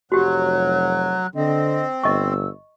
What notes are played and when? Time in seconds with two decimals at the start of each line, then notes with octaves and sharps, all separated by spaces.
0.12 F1 F#3 F#4 G4 F#6
1.35 D3 C4 D#5
2.04 G1 D#5 C#6 E6